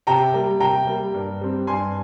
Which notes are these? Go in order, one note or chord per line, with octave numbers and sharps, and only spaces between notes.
C3 G5 A#5
G3 A#3
C3 G5 A#5
G3 A#3
G2
G3 C4
G2 G#5 C6